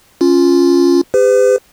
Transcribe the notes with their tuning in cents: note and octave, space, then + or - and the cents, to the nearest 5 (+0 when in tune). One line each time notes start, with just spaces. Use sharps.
C#4 +0 F4 +0
G4 +45 B4 +45